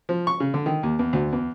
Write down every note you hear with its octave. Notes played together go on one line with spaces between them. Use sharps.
F3
C#6
C#3
D3
D#3
D#2
E2
D2
E2